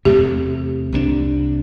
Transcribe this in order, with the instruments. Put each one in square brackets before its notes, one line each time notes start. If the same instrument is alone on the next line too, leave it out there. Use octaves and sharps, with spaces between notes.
[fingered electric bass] E2 C3 A3 [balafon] G4
[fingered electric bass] C2 C3 G3 D4